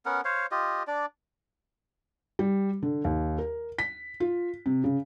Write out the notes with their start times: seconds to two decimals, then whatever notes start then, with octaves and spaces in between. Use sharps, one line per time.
0.05 B3 C#4 A#4 F#5
0.25 C5 C#5 F5
0.51 F4 G4 D#5
0.87 D4 D5
2.39 G3
2.82 D3
3.05 D#2
3.38 A#4
3.79 B6
4.20 F4
4.66 C3
4.84 C#3